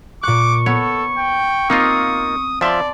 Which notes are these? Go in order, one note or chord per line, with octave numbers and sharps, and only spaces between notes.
A#2 C#6 D6 F#6
B3 A4 C#5
G5
A#3 C4 D#4 F4 D#6 E6 C#7
F3 D5 E5 A5 C6